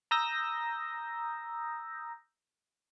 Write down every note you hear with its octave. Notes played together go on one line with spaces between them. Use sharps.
A#5 D#6 E6 G6 A#6